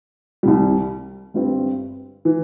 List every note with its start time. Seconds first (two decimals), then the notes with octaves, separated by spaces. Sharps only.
0.43 C2 C3 G3
1.34 G1 G2 G3 C4
2.25 E3